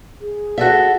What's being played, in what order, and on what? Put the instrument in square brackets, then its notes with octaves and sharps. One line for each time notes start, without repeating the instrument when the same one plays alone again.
[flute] G#4
[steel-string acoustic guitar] F#4 A4 E5